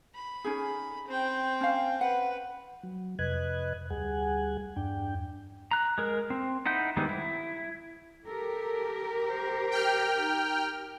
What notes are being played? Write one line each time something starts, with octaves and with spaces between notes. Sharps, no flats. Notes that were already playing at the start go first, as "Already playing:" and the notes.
B5
C#4 D#4 G#4
C4 G5
C#4 F5
B4 F#5
F#3
F2 C3 B4 D#5 F#6 G#6
D2 G3 G#4 F#5 G#5
E2 G2 D4 G5
A#5 F#6
G#3 A#4
C4
D#4 E4 F#5 G6
D#3 G3 G#3 B3 C4
E4
G4 A4 A#4
C5
G5 F6
D#4